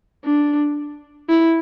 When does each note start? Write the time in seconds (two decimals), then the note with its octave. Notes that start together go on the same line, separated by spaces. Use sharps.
0.25 D4
1.29 E4